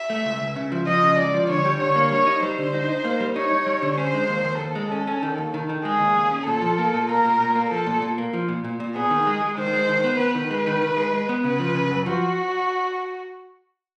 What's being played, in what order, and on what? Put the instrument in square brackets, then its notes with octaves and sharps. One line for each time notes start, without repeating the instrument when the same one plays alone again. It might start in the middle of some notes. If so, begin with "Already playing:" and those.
Already playing: [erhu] E5
[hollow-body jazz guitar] A3
C#2
C#2
C#3
F3
[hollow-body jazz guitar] F3 [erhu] D#5
[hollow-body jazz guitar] C#3
[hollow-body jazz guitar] C#2 [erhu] D5
[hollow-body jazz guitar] F3
[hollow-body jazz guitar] D3 [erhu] C#5
[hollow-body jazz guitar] G3
[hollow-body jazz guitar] D3 [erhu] C#5
[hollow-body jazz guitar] A#3
[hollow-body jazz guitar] G3 [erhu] C#5
[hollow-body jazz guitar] D#4
[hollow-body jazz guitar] G3 [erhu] C5
[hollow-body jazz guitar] D3
D#4
D#4
A#3
G3
[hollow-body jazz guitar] D#4 [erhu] C#5
[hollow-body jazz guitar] D#4
G3
D3
[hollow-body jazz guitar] C#4 [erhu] C5
[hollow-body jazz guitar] G#3
D#2
D#2
[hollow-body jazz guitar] D#2 [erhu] A4
[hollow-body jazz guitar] G#3
C#4
C#4
D#3
D#2
D#3
D#3
[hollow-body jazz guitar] G#3 [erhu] G#4
[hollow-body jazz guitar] D#2
D#2
C#4
[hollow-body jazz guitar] A#2 [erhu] A4
[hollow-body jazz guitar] F3
A#3
A#2
[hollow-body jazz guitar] A#3 [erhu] A#4
[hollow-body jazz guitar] A#2
A#2
A#3
[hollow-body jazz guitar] F3 [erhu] A4
[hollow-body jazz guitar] A#2
A#2
A#3
F3
A#2
A#2
A#2
[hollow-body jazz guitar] B3 [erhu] G#4
[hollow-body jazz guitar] D#3
G#3
G#3
[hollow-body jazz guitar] D#3 [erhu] C5
[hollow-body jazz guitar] G#3
D#3
B3
[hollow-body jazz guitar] B3 [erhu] B4
[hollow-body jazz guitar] D#3
G#3
D#3
D#3
G#3
G#3
B3
[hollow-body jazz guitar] C#3 [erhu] B4
[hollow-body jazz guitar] F3
C#3
F#2
[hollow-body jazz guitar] F3 [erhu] F#4